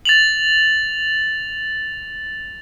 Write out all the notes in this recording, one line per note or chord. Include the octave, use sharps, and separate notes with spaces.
A6 F7 F#7